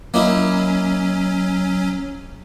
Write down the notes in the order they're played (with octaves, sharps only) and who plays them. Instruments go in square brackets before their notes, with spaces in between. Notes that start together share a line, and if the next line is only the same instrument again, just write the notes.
[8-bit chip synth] F#3 C#4 [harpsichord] A#3 D#4 E4